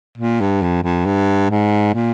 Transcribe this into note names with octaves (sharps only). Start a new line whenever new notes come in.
A#2
G2
F2
F2
G2
G#2
A#2